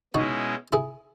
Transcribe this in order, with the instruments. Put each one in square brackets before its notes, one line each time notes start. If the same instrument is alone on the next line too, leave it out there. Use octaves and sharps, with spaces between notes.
[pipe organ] B2 G#3 C#4 E4 [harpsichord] D#4 F#4
[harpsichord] E4 G#4